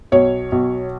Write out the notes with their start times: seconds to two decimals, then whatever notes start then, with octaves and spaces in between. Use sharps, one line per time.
0.12 B1 C#5
0.52 B1